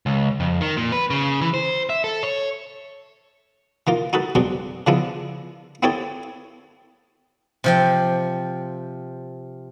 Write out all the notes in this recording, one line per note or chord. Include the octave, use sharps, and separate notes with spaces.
C#2
F2
D#3
A#2
B4
C#3
E3
C5
E5
A4
C#5
E3 A#3 F4
D#4 F#4 A4 B4
B2 F#3 G#3 C4 D4 G4
C#3 F3 G#3 B3 D4 E4
B3 C4 E4 G4 A4 C#5
C3 F3 G5